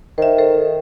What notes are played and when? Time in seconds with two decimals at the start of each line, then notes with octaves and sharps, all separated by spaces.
0.18 D#3 C5 E5
0.38 A4 C5